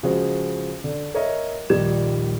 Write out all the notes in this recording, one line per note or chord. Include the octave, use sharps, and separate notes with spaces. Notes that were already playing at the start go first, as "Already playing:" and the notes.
C#3 F3 G#3 F#4 G#4 C5
D3
A#4 C#5 D#5 E5
D#1 A#1 D#3 G3 G#6 E7